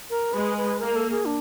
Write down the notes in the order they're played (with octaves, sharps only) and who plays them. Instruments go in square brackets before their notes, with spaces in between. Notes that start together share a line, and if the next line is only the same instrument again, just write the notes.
[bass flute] A#4
[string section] G#3 [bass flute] B4
[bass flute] B4
[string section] A#3 [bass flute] A#4
[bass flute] A4
G#4
D4